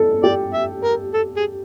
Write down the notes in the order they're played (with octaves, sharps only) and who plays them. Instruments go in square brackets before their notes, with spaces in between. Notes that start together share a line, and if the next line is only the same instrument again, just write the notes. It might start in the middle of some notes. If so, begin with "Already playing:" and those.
Already playing: [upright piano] A4
[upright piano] G4 [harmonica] D5
[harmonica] E5
A#4
A4
G#4